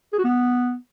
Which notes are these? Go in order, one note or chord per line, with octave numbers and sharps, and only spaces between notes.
G#4
F#4
B3